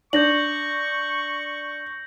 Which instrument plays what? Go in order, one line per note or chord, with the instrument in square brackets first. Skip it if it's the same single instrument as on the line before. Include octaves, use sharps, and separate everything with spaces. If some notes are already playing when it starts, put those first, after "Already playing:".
[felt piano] D4 [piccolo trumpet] C#6 [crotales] G6 A#6 F#7